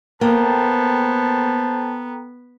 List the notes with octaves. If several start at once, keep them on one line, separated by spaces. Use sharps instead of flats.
A#3 B3 A4 C5 G5 A5 A#5